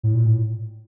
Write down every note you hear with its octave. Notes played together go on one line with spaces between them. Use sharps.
A2
A#2
A2